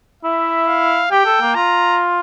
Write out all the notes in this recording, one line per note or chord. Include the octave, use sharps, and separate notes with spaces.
E4 E5
F5
G4 G5
A4
A#3
F4 A#5